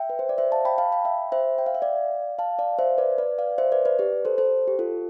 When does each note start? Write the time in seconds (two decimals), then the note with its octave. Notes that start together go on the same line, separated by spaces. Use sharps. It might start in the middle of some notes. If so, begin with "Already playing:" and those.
Already playing: E5 G5
0.10 B4
0.19 C5
0.29 D5
0.38 C5 E5
0.52 F5 A5
0.65 G5 B5
0.78 F5 A5
0.92 G5 B5
1.05 E5 G5
1.32 C5 E5
1.58 G5
1.66 F5
1.75 E5
1.82 D5 F5
2.39 F5 A5
2.59 D5 F5
2.79 C5 E5
2.98 B4 D5
3.18 B4 D5
3.38 D5 F5
3.58 C5 E5
3.72 B4 D5
3.85 B4 D5
3.99 G4 B4
4.25 A4 C5
4.38 A4 C5
4.68 G4
4.79 F4 A4